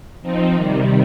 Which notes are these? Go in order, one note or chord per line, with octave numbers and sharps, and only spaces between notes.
F3 C4 D#4
C3 D#3 G3